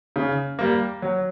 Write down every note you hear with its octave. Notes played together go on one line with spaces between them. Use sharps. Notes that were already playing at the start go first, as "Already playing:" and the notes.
C#3
G3 A#3
F#3